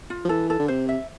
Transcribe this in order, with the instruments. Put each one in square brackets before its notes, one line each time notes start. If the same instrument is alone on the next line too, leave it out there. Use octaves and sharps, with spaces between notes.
[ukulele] F4
[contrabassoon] F3
[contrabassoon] E3 [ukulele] A4
[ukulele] A4
[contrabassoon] D3
[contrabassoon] C3 [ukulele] C5
[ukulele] E5